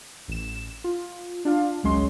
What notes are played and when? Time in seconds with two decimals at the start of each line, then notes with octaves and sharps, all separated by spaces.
0.28 A1 E7
0.84 F4
1.45 D4 F4 F5
1.83 G#1 C#2 F#3 G#3 C#4 C6